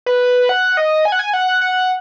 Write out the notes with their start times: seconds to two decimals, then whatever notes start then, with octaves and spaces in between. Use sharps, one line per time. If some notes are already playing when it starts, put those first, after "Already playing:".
0.06 B4
0.49 F#5
0.77 D#5
1.05 G#5
1.12 F#5
1.19 G#5
1.34 F#5
1.61 F#5